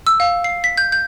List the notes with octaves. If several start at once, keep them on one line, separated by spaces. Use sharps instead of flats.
E6
F5
C7
B6
G6
G6